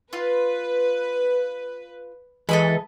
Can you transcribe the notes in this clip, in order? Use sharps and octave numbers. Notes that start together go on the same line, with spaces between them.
F4 B4
E3 G#3 A4 D#5 B5